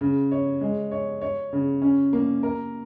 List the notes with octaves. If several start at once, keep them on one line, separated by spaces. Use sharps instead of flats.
C#3
C#5
G#3
C#5
C#5
C#3
C#4
A#3
A#4